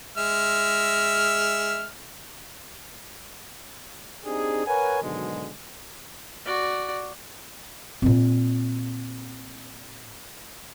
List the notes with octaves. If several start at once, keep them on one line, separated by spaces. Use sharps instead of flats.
G#3 E5 F6
C4 D4 D#4 G4 G#4
A#4 B4 C#5 F#5 G#5
G#2 B2 D3 D#3 F#3 G#3
F#4 D5
A#2 C4